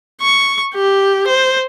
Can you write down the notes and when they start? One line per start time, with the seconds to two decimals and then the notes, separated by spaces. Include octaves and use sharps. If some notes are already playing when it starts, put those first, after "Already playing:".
0.21 C#6
0.75 G4
1.27 C5